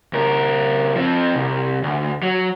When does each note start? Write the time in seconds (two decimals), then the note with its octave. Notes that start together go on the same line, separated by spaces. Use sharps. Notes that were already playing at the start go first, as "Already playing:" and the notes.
0.13 C#2 A#4
0.97 F3 C4
1.35 C2
1.83 D2
2.23 F#3